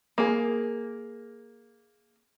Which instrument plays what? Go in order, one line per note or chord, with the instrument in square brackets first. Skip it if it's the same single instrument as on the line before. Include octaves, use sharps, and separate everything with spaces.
[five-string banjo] A#3 G#4